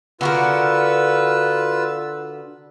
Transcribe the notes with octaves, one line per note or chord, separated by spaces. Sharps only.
D3 F4 F#4 A#4 B4 E6